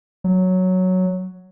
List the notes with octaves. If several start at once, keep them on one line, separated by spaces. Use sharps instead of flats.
F#3